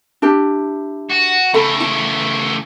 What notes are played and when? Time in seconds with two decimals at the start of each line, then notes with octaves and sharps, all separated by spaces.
0.22 D4 E4 G4
1.10 F#4
1.54 C#3 A3 A4 B5
1.80 E4